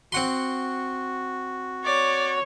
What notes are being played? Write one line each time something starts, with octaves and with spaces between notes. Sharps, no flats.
C4 F#4 F#5 C6
C#5 D5